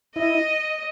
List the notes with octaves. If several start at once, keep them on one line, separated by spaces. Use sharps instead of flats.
E4 D#5